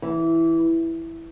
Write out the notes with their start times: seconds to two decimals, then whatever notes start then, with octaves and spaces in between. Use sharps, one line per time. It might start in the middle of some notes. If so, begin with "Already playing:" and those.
0.02 E3